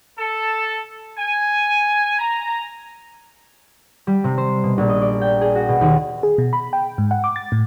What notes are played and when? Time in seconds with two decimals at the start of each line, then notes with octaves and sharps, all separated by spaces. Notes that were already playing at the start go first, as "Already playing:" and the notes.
0.19 A4
1.18 G#5
2.19 A#5
4.07 G3
4.24 C3
4.38 C5
4.64 B2
4.78 A#1
4.89 D#5
5.02 D5
5.21 G5
5.41 G#4
5.55 F#4
5.69 B2
5.81 D#2
6.23 G#4
6.38 B2
6.53 B5
6.73 G5
6.98 G#2
7.11 F#5
7.24 D6
7.36 A6
7.52 A2